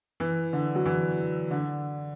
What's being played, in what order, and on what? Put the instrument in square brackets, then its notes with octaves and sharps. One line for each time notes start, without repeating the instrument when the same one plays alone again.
[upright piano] E3
D3
F#3
E3
D3